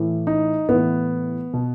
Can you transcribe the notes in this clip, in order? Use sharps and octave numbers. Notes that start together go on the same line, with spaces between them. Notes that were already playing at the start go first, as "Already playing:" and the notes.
Already playing: A2 E3
D#4
A2 E3 B3
B2